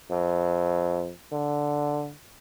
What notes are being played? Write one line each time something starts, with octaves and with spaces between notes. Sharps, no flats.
F2
D3